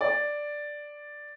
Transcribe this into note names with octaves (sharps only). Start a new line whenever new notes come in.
D5